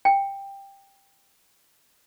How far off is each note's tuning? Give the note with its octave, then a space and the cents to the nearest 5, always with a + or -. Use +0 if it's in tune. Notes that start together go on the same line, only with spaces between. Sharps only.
G5 +15